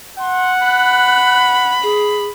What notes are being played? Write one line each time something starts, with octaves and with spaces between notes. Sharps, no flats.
F#5 C6
B5 F#6
G#4